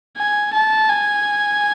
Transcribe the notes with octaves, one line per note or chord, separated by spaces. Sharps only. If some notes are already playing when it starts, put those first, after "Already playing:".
G#5
A5
G#5